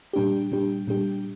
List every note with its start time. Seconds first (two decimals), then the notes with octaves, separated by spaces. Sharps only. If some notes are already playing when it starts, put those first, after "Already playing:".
0.13 A#2 G3 D4 G4
0.52 A#2 G3 D4 G4
0.87 A#2 G3 D4 G4